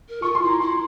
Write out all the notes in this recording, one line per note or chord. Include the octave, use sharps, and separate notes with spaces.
A#4
F4 C#6
C6
E4
A#5
E4 C6